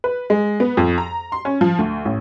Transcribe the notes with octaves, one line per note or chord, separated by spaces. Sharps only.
B4
G#3
B3
F2
A#5
C6
C#4
F3
D2
A1